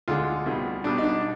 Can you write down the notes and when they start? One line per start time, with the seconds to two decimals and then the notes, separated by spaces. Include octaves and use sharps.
0.08 D2 D3 G#3 F4
0.46 C2 B2 G3
0.84 B1 B2 G3 D4
0.98 D#4
1.03 D4